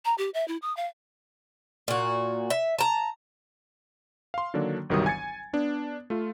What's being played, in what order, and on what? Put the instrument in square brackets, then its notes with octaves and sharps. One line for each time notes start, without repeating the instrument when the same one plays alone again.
[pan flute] A#5
G4
E5
E4
D#6
F5
[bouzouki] A#2 F#4
E5
A5 A#5
[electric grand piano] F5 C6
D3 D#3 F#3 A#3 D4
G1 C2 D#3 F#3 G3 D#6
G#5 G#6 A6 C#7
B3 D4
A3 F4